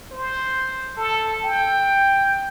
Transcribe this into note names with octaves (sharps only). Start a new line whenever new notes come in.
C5
A4
G5